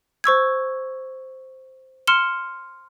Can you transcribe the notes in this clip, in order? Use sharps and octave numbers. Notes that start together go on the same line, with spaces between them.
C5 C#6 E6 G#6
C6 F6 C#7 E7 G7